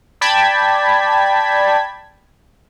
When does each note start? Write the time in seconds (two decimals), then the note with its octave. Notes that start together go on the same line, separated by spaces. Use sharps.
0.21 D5 G5 A5 B5 G#6 B6